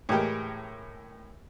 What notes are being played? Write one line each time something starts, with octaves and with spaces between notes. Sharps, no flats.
A2 E3 G#3 G4 A#4 G5